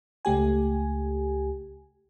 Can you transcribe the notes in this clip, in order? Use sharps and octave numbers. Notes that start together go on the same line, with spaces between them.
C#2 A3 G4 G#5